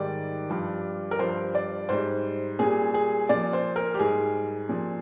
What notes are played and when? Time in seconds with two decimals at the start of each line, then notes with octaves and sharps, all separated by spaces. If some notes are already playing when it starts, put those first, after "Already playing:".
Already playing: G#2 D#3 G3 D5
0.49 G2 F3
1.11 A#4
1.19 G2 F3 C5
1.55 D5
1.89 G#2 G3 C5
2.59 A#2 G3 G#4
2.94 G#4
3.29 A#2 F3 D5
3.53 C5
3.76 A#4
3.94 G4
3.99 G#2 G3 G#4
4.69 A#2 F3